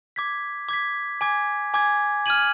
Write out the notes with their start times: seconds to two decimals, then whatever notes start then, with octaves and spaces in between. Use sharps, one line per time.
0.16 D6 G#6 B6
0.69 D6 G#6 B6
1.21 G#5 D6 G#6
1.74 G#5 D6 G#6
2.26 F6 G#6 D#7 F#7